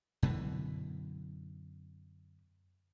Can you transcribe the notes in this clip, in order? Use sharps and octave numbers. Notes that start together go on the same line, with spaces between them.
F#2 B2 D3 E3